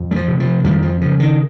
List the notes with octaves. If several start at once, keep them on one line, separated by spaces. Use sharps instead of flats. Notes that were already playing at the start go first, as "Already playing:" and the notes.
Already playing: F2
G3
F3
C3
F3
F2 D#3 G3
F3
C#3 F3
D#3